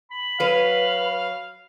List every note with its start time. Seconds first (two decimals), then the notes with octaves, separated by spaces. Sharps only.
0.11 B5
0.40 F#3 B4 F5